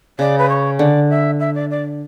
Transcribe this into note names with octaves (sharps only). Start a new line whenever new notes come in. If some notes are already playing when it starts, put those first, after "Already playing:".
C#3 D5
B4
C#5
D3 D5
E5
E5
D5
D5